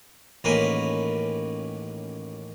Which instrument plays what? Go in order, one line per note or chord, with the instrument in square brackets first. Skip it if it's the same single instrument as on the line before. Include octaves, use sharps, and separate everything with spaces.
[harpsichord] A1 D#2 C#4 A#4 B4 C6